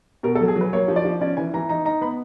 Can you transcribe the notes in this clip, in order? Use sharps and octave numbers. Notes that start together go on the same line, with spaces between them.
B2 A#4
A4
F#3
G#4
F#3
B4
A#3 C#5
F3
D5
F3
C#4 D5
E3 G#5
E3 A#5
D#4 A#5
D#4 A#5
B3 B5